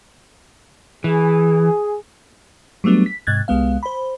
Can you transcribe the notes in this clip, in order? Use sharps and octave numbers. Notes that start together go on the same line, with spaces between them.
E3 G#4
F#3 G3 A3 B3 D4
B6
G#2 C3 F#6 G#6 A6
C2 G#3 B3 F5
C5 B5